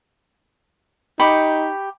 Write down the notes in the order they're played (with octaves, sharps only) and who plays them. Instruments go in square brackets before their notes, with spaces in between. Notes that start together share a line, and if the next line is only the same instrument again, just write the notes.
[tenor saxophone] D#4 [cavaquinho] G4 B5 C#6